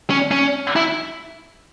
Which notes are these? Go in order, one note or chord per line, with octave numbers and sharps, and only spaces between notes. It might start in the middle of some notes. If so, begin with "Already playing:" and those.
C#4
C#4
E4